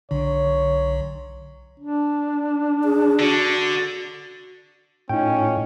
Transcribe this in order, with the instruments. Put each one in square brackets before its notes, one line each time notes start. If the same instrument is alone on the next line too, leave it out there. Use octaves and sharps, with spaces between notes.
[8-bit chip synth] B1 [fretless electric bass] D3 [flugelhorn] C#5
[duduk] D4
[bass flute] G#4
[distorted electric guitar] D3 [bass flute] F#4
[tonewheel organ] A2 [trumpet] C#4 [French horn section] D#4 F4 [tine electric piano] G5